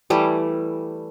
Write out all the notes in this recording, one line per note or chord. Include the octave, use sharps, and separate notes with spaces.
E3 G3 A3